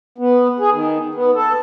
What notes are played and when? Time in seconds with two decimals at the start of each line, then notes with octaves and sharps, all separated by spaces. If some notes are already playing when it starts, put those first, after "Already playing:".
0.18 B3
0.60 G#4
0.72 D#3
1.15 B3
1.35 A4